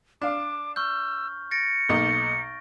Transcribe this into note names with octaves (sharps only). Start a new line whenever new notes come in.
D4 F5 D6
C#6 E6 F6 G6
A6 A#6 C#7 D7
B1 A#3 D#4 C#6